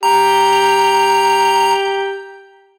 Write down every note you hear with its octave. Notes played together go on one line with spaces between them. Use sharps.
G4 A#5